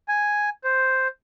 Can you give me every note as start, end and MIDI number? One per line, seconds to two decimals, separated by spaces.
0.08 0.50 80
0.64 1.08 72